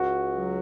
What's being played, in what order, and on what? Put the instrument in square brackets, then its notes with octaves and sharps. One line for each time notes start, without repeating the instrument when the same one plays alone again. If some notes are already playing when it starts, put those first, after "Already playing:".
Already playing: [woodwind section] C#2 [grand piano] F#4
[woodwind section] F#3